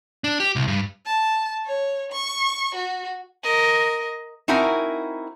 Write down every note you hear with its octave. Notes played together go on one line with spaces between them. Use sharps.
D4
G4
C2
G2
A5
C#5
C#6
F#4
A#4 D#5
C4 D#4 E4 F#4 A#4 G#5